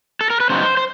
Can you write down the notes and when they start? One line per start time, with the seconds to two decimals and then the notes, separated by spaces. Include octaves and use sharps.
0.21 A4
0.30 A#4
0.40 B4
0.49 C#3 F#3 B3 D#4 C5
0.77 C5